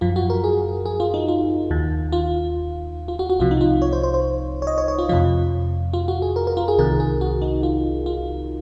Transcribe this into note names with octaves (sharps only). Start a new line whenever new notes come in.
F#2 F3 F4
F#4
A#4
G#4
G#4
F4
D#4
F4
D#2 D#3
F4
F4
F#4
F#4
C2 C3 F3 F4
D#4
F4
C#5
C5
C5
C5
C#5
D#5
C#5
C#5
F4
F2 C3 F3 F4
F4
F#4
G#4
A#4
A#4
F4
G#4
C2 C3 D#3 A#4
G#4
F#4
D#4
F4
F4